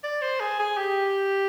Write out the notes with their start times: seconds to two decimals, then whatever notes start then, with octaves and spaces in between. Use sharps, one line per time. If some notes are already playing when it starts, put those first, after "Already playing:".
0.04 D5
0.22 C5
0.40 G#4
0.59 G#4
0.77 G4